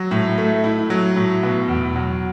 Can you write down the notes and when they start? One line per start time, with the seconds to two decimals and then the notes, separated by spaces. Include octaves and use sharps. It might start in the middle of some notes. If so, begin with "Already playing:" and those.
Already playing: F#3
0.11 A2
0.38 A3
0.64 E4
0.90 F#3
1.16 A2
1.43 B2
1.68 E2
1.96 F#3